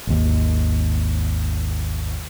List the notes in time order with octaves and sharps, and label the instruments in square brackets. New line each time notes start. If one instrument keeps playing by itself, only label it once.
[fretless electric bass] G#1 D#2